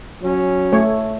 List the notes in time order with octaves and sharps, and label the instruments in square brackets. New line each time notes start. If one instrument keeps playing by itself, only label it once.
[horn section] F#3 C#4
[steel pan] A3 C#5